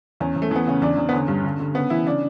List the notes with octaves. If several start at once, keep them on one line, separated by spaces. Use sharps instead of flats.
E2 C#4
E2
A3
E3 B3
C#3 C#4
E2 D4
E2
B3
D3 C#4
G2
D3
D3
C#3 B3
E3 E4
C#3 D4